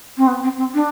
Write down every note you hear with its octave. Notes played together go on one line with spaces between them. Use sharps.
C4
B3
C4
C4
D4